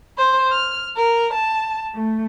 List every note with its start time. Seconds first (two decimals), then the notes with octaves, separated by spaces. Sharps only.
0.18 C5
0.50 F6
0.96 A#4
1.33 A5
1.94 A3